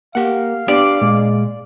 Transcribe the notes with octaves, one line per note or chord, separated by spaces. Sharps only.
A#3 G4 F5 F#5
B3 D4 G4 D5
A#2 G#3